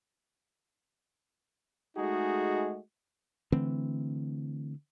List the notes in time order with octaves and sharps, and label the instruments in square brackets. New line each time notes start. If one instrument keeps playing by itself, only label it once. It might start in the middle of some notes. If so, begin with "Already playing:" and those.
[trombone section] G#3 A3 D#4 F#4 G#4
[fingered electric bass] D3 E3 A3 C4